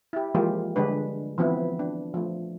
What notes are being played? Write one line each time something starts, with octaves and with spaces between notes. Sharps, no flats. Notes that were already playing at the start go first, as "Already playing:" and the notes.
E4 G4
E3 F3 G#3 A#3 F4 G4
D3 G3 G#3 D4 B4
E3 F3 B3 C4 E4
D4
F3 A3